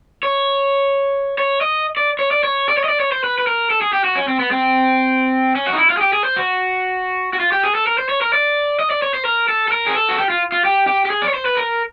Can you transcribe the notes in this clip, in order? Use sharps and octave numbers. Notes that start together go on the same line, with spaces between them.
C#5
C#5
D#5
D5
C#5
D5
C#5
D5
C#5
D#5
D5
C#5
C5
B4
B4
A#4
A4
G#4
G4
F#4
C#4
C4
B3
C4
C#4
F#4
D#4
E4
F4
G#4
G4
G#4
C5
F#4
F#4
F4
G4
G#4
A4
A#4
C5
C#5
A#4
D5
D#5
D5
C#5
C5
A#4
A4
A4
A#4
G#4
A4
F#4
G4
F4
F4
G4
G4
G4
G#4
D5
C#5
C5
B4
A#4